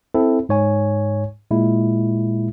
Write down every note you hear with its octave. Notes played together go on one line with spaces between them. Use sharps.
C4 E4 A4
G#2 C#5 G#5
A#2 G#3 E4